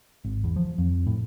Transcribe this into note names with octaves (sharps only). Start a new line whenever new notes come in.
G#1
E2
F3
F2
A2